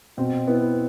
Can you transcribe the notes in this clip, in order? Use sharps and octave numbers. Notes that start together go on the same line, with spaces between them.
B2 C4
B3 E4